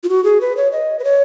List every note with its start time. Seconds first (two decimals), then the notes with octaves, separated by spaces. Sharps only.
0.03 F4
0.09 F#4
0.24 G#4
0.41 B4
0.57 C#5
0.72 D#5
0.99 B4
1.04 C#5